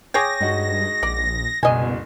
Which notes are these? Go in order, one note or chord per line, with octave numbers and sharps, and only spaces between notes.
G#4 C#5 G5 D6 D#6 G#6 A#6
G2 G#3 D#4 F#4
A#1 D5
F#1 C2 B2 D#5 G#5